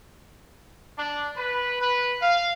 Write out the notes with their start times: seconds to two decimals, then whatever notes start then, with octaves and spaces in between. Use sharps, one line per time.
0.97 D4
1.37 B4
1.81 B4
2.22 F5